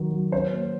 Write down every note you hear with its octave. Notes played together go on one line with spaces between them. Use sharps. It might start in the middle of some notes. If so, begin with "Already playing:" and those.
Already playing: D#3 F#3 D#4
F#3
C#4 C5
A#3